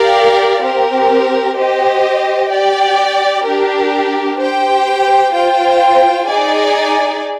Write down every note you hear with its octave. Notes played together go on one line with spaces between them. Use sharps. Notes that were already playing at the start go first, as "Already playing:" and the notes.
Already playing: G4 A#4 D5 F5
C4 G4 A#4
G4 C5 D#5
G4 D5 G5
D4 G4 A#4
G4 C5 G5
F4 C5 G5
D#4 G#4 D5 G#5